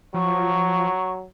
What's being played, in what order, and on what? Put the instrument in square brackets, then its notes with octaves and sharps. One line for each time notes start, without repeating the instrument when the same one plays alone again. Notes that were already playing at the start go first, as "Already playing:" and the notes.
[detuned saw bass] F3 [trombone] F#3 [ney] C#6